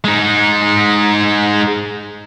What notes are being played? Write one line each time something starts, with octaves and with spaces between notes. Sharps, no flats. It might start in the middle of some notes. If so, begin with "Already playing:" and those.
G#3 D#4